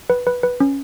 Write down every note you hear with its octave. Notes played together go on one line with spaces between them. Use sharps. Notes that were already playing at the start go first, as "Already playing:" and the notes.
B4
B4
B4
C#4